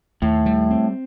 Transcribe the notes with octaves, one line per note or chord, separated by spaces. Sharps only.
D#2 A2
G3
C4